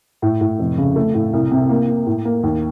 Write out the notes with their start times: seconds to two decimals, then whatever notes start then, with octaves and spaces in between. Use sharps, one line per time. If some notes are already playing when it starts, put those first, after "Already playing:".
0.22 A2
0.41 A2
0.59 F1
0.78 C#3
0.96 A3
1.14 A2
1.33 C2
1.51 C3
1.69 A#3
1.88 A#3
2.06 A2
2.25 A#3
2.43 D#2